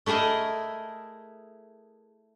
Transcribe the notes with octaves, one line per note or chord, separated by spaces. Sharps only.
A3 E4 G#4 A#4 D#5